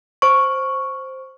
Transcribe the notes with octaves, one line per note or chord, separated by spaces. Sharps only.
C5 C#6